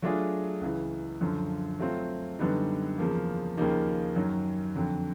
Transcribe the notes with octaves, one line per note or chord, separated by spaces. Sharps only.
F#3 A3 D4 F4 G#4
C#2 C#3 E3
F#2 D3 F3
F#3 A3 C4 F4
F#2 D3 G3 B3 D#4
E2 C#3 F3 A#3
D#2 C#3 F3 A#3 D#4
F#2 D#3 F#3
F2 D3 F#3